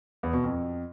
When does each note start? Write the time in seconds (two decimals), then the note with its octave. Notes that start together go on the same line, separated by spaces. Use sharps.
0.23 E2
0.33 B2
0.43 F2